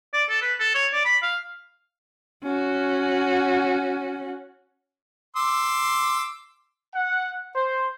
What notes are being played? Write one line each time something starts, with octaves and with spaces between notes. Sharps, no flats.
D5
A4
B4
A4
C#5
D5
B5
F5
C#4 F#4
C6 D6 E6
F#5
C5